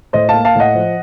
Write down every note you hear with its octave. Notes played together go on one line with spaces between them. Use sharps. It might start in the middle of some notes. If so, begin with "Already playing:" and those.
A2 C5 D#5
A#3 F5 A5
F5 A5
A2 D#5 F#5
F3